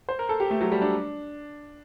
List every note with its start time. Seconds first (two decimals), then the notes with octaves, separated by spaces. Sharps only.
0.09 C5
0.19 A#4
0.29 A4
0.40 G4
0.50 A3
0.61 F#3
0.72 G3
0.82 D4